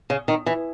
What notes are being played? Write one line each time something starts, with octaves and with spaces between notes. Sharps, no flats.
C#3
D#3
E3